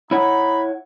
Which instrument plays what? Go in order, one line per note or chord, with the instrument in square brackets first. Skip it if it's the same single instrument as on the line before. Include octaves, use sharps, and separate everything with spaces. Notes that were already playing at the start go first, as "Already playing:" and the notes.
[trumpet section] D#4 B5 [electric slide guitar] E4 C#5 F#5